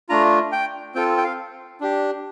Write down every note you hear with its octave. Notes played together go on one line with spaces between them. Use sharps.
A3 D4 F4 A#5
G5
C4 F4 A4 G5
G5
F5
D4 G4